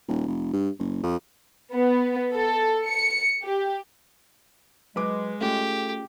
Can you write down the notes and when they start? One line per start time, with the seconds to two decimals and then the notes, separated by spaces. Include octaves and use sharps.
0.08 D#1
0.27 F1
0.53 G2
0.79 F#1
1.03 F2
1.75 B3
2.34 A4
2.87 C#7
3.45 G4
4.96 F#3 G#3 B4 D6
5.41 A3 C#4 F4 G4 G#4